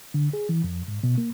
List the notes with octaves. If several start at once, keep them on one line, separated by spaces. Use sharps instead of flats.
D3
G#4
E3
F2
G#2
B2
A#3